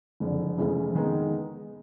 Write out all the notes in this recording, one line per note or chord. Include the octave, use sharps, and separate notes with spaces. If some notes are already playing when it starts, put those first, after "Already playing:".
F#1 F2 D3
F1 F2 C#3 E3 G#3
D#3 G#3 B3 D#4